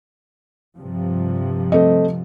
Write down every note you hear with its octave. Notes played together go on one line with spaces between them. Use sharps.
G2 C3 F3
A3 C4 D#5